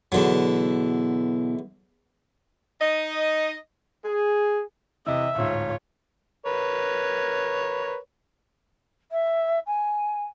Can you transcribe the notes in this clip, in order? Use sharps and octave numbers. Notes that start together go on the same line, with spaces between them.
E2 B2 D3 F#3 E4
D#4 D#5
G#4
C3 E3 D#5 E5
D1 G#2 F4 C#5
A#4 B4 C#5
E5
G#5